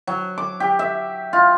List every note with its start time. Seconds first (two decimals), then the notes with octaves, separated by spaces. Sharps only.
0.07 F#3
0.38 D6
0.60 G4
0.79 E5
1.33 F4